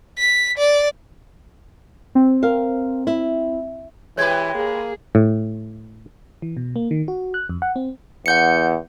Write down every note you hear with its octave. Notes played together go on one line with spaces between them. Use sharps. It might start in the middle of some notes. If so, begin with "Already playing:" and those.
B6
D5
C4
A#4 F5
E4
E3 G#3 G4 B4 C#5 G#6
A#3 G#4
A2
E3
B2
A#3
D#3
F#4
F#6
F2
F#5
C4
E2 F#5 G6 C#7